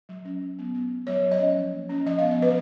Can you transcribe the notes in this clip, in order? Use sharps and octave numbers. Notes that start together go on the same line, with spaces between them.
F#3
C#4
F#3
B3
B3
B3
F#3 C#5
F#3
D#5
C#4
F3
A#3
C#4
F3 D#5
B3 F5
D#5
F3 B4